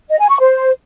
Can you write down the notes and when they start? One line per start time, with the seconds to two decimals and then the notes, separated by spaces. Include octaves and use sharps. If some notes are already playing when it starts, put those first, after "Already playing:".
0.09 D#5
0.19 G#5
0.30 C#6
0.40 C5